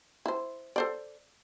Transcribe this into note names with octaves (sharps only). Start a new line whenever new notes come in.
E4 C5
A4 C5 D5